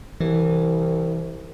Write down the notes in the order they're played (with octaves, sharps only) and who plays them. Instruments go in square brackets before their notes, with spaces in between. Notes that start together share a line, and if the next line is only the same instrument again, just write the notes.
[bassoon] C2 [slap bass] E3